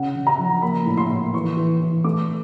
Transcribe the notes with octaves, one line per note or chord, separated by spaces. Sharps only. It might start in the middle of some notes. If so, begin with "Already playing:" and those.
Already playing: C#3 F#5
C#3
A#5
F3
A#3 B5
A2
C6
A2
E3 C#6
E3
E3
A3 D6